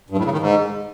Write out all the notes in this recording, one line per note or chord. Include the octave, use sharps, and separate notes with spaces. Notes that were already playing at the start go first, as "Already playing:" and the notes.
G2
A2
C#3
D#3
G#2